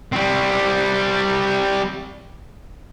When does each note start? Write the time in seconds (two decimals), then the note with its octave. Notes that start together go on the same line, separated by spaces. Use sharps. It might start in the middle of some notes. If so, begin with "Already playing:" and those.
0.13 G3 C4